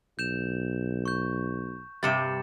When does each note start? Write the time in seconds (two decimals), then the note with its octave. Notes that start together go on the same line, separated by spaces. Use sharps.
0.19 B1 G6 E7 F7
1.06 C#6 G6
2.03 G2 C3 G3 A6 C#7 E7